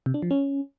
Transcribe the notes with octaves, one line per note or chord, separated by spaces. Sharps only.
C3
D4
F3
C#4